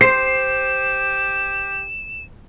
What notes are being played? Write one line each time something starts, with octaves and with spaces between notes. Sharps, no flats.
G4 C5 C7 E7